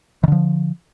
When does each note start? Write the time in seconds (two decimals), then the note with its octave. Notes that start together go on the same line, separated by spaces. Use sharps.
0.23 D#3
0.28 D3
0.32 F3